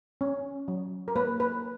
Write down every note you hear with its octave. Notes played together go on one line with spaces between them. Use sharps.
C#4
F#3
A#4
A#3 B4
B4